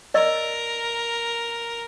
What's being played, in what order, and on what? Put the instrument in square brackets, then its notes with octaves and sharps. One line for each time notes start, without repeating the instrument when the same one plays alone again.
[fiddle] A#4 [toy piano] D5 D#5 E6